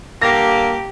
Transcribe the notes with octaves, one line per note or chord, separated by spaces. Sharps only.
D3 G3 A#3 G4 A#6